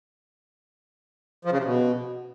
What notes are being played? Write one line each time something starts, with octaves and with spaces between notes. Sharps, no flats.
F3
C#3
C3
B2